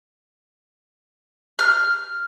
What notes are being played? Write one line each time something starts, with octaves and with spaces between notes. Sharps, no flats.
F6